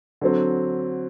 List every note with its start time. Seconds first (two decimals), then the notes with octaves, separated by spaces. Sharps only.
0.21 D3 F#3 C4